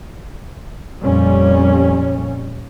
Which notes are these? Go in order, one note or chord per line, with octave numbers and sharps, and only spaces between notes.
F2 A#2 G3 C#4